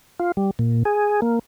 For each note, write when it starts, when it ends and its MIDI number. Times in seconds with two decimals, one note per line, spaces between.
0.20 0.32 65
0.37 0.51 55
0.59 0.83 46
0.85 1.21 68
1.22 1.39 58